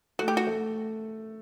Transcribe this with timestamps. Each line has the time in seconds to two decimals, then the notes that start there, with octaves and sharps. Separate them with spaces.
0.19 A3 F#4
0.28 G4
0.37 F#4
0.47 A3